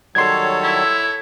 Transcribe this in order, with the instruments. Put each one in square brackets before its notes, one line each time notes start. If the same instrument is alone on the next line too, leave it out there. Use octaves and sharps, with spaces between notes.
[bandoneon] D#3 F#3 G3 [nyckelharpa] A4 C#5 [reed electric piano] C6 G#6
[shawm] E4